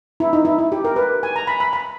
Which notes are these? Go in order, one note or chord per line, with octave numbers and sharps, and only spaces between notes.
E4
D#4
E4
E4
G4
A#4
B4
G#5
A#5
B5
B5
B5